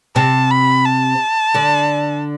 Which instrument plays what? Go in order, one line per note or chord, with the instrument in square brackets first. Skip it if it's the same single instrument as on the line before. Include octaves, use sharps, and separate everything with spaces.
[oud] C3 C4 [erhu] A5
[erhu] B5
A5
[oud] D3 D4